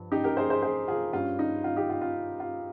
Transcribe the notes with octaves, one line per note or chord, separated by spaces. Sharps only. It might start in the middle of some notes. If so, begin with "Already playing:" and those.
Already playing: G2 F3
D#4 G4
G4 A#4
G#4 C5
G#4 C5
G#4 C5
F4 G#4
G2 G3 C#4 F4
D#4
F4
D#4 G4
F4
F4
F4